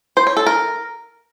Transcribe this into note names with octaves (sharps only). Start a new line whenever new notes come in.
C5
C#5
A4
A#4